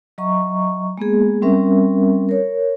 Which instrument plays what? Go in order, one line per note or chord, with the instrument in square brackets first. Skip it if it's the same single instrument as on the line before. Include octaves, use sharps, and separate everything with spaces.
[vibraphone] F#3 D#5 E5 A#5 C#6
G#3 A#3 B3 G#4
G3 C4 C#4 A#4 E5
A#4 C#5